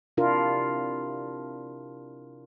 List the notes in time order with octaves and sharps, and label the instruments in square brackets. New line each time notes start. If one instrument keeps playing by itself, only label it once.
[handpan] C3 D4 E4 F4 A#4